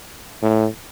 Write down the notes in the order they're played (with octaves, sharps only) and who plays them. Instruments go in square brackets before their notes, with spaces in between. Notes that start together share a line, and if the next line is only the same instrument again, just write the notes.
[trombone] A2